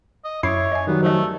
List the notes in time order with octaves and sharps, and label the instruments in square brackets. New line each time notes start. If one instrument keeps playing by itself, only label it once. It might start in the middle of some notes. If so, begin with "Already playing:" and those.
[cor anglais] D#5
[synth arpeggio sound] F#2 E4 C7 [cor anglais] C#5 [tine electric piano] E5 D6
[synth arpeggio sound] D#5 G#5
[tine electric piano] D#3 F#3 G3 [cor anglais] B3
[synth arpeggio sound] F3 D#5 [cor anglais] A3